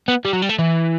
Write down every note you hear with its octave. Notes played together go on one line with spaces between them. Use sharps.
B3
G3
F#3
G3
A3
E3